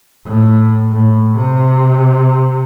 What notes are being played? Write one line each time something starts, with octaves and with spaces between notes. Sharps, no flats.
A2
A2
C3